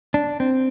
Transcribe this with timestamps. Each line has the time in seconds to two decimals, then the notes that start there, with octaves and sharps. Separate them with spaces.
0.14 D4
0.40 C4